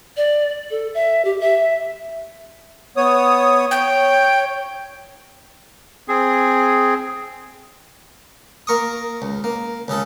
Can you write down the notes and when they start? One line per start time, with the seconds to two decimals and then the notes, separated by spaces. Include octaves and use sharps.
0.17 D5
0.71 A4
0.94 E5
1.25 G4
1.40 E5
2.97 B3 C#5 D#6
3.71 C#5 G5
6.08 C4 G#4
8.67 A#3 A#4 C#6 D#6
9.22 C#2
9.44 A#3
9.88 C#2 C#3 G#4 A4